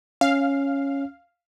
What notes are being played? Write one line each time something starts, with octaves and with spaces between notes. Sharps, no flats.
C#4 F5